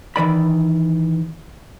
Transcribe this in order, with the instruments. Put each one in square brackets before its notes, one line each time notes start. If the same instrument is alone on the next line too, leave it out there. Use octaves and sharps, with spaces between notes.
[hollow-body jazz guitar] D#3 E3 D5 B5